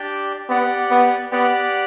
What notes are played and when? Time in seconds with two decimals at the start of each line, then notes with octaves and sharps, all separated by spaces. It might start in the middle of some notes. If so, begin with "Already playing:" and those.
Already playing: D4 G4 D5 G5
0.49 B3 G4 D5 F#5
0.91 B3
1.31 B3 G4 D5 F#5